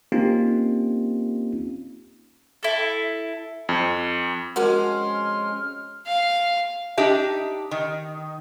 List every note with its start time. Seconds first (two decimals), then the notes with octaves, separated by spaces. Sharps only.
0.12 A#3 C4 C#4 D#4 F4 G4
2.63 E4 A4
3.69 F2
4.56 F2 G#3 C#4 F#4 A#4 F#5 C6 F6
6.07 F5
6.97 D4 D#4 G4 E5
7.71 D#3